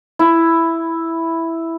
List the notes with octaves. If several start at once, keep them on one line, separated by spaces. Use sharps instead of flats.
E4